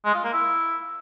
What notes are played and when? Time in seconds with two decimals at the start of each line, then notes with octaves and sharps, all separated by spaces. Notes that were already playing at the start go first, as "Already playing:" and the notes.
0.05 G#3
0.14 F4
0.24 A#3
0.33 E4